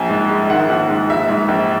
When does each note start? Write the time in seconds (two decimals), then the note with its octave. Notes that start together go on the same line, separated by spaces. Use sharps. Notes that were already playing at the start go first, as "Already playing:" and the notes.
Already playing: A#1 G#5
0.10 G#2
0.30 G#3
0.50 D#3 F#5
0.70 A#1
0.90 G#2
1.10 A#1 E5
1.29 G#2
1.48 A#1